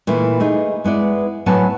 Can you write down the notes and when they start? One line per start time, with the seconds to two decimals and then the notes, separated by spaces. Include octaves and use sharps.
0.07 A#2 E3 A3 E4
0.40 A3 D#4 G#4
0.84 G#3 B3 E4 D5
1.46 A2 F#3 B3 F#5 G#5 A5